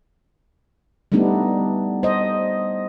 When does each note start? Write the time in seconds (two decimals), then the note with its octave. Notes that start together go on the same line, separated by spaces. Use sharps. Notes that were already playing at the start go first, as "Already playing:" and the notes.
1.12 G3 A3 B3 D4 D#4
2.03 C5 D#5